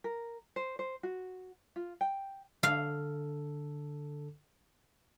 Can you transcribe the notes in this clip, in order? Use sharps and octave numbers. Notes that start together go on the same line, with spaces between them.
A#4
C5
C5
F#4
F4
G5
D3 A4 F5